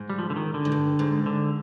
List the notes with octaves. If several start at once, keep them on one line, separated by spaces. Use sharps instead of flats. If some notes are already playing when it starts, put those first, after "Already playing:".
Already playing: G#2
G3
F3
D3
D#3
D3
G#2
G2
G#2
D3